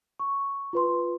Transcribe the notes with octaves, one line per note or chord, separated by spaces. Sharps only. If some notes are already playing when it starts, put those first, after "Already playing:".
C#6
F4 B4 C6